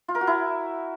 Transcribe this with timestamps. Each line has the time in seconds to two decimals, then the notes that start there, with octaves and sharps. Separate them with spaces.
0.08 F4
0.15 A#4
0.21 F#4
0.27 E4